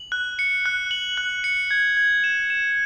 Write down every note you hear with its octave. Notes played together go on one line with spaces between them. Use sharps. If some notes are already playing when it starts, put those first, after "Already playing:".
Already playing: F#7
F#6
C#7
F#6
F#7
F#6
C#7
G#6
G#6
E7
E7